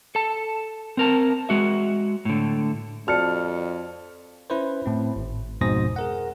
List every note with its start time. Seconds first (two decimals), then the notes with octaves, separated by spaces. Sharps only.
0.15 A4 A5
0.97 C4 A#4 A5
1.49 G#3 F#4 E5
2.25 A2 D3
3.08 F2 F#4 D5 A5 F6 C#7
4.50 C#4 E4 B4 C5
4.86 A2 C4
5.16 G#1
5.61 F2 G#2 B2 C5 D#6 A#6
5.96 G#4 A#4 F#5